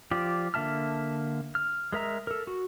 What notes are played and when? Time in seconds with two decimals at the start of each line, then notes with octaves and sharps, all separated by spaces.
0.11 F3 F4 G4 D5
0.54 D3 A#3 E5 A5 F6
1.55 F6
1.92 G#3 A#4 E5 A#5
2.27 A4 A#4
2.47 F#4